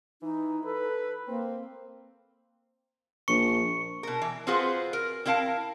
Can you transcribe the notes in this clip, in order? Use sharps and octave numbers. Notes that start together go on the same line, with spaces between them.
E3 D#4
A4 B4
A#3 C4
A#1 C#6 C#7
B2 A#4
E3
C4 F4 F#4 G#4 B4 C5
A#4
C4 E4 A#4 F5 A5